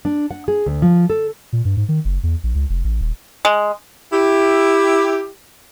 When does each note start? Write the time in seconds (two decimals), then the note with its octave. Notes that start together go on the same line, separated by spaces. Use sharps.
0.05 D4
0.31 F#5
0.48 G#4
0.66 D2
0.82 F3
1.10 A4
1.53 A#2
1.65 G2
1.77 G#2
1.89 D#3
2.05 F#1
2.23 E2
2.43 A#1
2.55 C#2
2.70 F1
2.84 A1
3.01 D#1
3.45 G#3
4.12 E4 G4